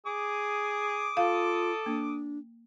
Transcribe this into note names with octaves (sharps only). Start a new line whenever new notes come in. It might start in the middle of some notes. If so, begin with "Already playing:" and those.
G#4 D6 D#6
F4 A4 F5
A#3 D4